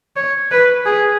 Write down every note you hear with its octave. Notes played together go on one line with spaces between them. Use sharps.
C#5
B4
G#4